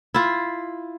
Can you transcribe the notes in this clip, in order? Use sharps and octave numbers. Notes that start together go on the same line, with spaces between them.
E4 F4